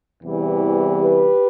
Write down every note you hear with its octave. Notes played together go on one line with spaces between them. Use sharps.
E2 C3 E3 G3
G4 B4